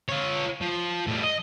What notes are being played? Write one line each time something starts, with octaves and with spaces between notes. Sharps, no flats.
F4 C#5
F3
A2 G3
D#5